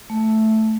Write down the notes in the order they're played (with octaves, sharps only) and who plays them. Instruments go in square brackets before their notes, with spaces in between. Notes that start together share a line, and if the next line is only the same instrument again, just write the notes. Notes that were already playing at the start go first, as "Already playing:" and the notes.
[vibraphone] A3